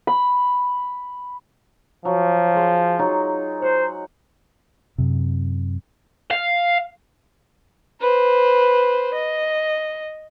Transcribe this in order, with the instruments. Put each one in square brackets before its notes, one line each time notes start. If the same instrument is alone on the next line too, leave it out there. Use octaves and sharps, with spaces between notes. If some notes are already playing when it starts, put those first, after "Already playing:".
[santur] B5
[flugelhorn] F3 [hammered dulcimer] F#3
[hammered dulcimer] G#4 C5
F#3 D#4 F4
[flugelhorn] C5 [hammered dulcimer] F#5
[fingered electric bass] F#2 C3
[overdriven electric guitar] F5
[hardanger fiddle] B4 C5
D#5